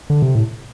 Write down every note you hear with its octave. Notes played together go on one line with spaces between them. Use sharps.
D3
C3
A2